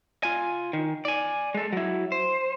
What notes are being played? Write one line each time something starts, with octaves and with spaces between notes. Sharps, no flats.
F4 G#5
D#3
D5 G#5
G#3 A4
F#3 E4
C5